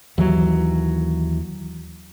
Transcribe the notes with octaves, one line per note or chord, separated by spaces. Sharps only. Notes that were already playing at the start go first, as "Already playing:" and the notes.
D#2 E3 F#3